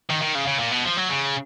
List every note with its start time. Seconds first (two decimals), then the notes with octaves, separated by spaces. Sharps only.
0.10 D#3
0.22 D#3
0.35 C#3
0.47 C#3
0.60 A#2
0.72 B2
0.85 F3
0.97 F#3
1.10 C#3